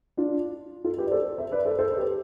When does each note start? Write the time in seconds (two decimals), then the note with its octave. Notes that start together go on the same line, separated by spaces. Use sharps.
0.17 D4 F4
0.84 F4 A4
0.98 G4 B4
1.06 D5
1.11 A4 C5
1.38 C5 E5
1.52 B4 D5
1.65 A4 C5
1.79 A4 C5
1.91 C5
1.96 G4 B4